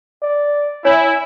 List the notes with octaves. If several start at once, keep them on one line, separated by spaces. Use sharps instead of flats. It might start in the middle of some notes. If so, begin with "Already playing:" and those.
D5
E4 C#5 G#5